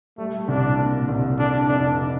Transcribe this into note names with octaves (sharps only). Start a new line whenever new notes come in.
G3 A3
C2 D4
A#2
C2
D3 D4
F1 D4